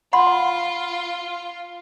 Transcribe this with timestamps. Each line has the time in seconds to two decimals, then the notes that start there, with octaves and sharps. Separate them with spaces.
0.13 F4 F#5 B5 C6